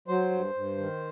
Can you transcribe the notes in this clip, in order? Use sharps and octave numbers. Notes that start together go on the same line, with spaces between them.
F#3 C5
G2
G2
D#3